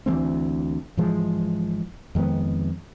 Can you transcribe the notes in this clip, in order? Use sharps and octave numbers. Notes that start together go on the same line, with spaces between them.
D2 E3 A3 C4
G#2 E3 F3 G#3
F2 D#3 G#3 B3